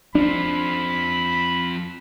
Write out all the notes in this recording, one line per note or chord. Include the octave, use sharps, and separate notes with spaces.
F3 C4 D4 B5